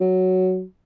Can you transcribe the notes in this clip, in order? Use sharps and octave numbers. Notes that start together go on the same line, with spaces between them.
F#3